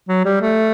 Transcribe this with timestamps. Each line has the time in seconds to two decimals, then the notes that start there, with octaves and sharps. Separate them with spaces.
0.08 F#3
0.25 G3
0.41 A3